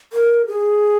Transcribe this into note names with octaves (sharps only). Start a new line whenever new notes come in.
A#4
G#4